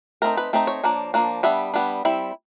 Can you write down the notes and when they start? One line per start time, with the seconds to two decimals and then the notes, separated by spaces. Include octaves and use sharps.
0.22 A3 C4 D#4 A#4
0.37 B4
0.53 A3 C4 D#4
0.67 C#5
0.83 F3 A#3 D4
1.14 F3 A#3 D4
1.43 G3 B3 D4 E5
1.74 G3 B3 D4
2.05 G3 C4 E4